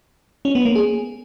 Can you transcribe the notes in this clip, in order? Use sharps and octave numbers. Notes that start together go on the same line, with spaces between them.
C#4
B3
A#3
G#4